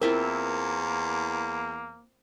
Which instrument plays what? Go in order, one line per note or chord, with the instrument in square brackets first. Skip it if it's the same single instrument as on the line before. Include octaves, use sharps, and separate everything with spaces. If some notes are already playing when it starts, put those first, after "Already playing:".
[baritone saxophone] E2 [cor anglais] A#3 [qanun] C4 E4 F4 [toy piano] A#4